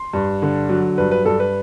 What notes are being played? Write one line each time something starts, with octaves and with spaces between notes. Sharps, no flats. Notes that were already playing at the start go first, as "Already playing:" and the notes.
Already playing: C6
G2
D3
F#3
G2 B4
B4
G2 A4
B4